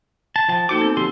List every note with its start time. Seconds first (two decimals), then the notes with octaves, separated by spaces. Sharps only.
0.36 A5
0.48 F3 G5 A5
0.69 A#3 D#4 F#4 A4 C5 D6
0.81 B3 C4
0.97 D3 F3 G4 C6